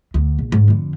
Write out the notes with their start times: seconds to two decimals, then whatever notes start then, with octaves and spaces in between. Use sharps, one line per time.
0.14 D2
0.38 A#1
0.52 G#2
0.68 F2 D3